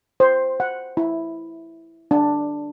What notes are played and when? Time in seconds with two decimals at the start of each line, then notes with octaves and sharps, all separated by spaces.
0.20 C5
0.60 F#5
0.97 E4
2.11 D4